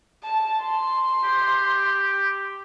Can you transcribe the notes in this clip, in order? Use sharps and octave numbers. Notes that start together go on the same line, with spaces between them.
A5
C6
G4